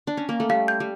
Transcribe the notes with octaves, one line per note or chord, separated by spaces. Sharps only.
D4
C#4
A#3
A3
G3 F5
G6
G3